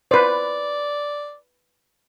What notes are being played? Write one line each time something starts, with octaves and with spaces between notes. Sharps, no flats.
B4 C5 D5